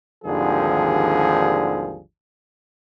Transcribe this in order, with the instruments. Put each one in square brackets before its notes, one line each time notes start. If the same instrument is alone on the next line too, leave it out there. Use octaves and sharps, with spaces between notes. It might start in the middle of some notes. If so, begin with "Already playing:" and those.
[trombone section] G#1 D#2 D3 F3 G3 G#4